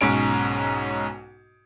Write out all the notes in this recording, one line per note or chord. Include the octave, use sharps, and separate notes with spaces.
B1 G#2 C#4 D7